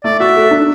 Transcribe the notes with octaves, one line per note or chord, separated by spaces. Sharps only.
A3 D5
F#4 E5
A4
D4